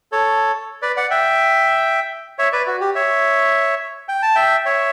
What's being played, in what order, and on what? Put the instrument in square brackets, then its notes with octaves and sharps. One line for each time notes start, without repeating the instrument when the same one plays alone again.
[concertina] A4 C#5
B4 D5
D5 F#5
E5 G5
C#5 E5
B4 D5
F#4
G4
C#5 E5
G5
A5
E5 G5
C#5 E5